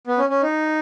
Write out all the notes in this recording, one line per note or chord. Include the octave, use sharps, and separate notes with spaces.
B3
C#4
C#4
D#4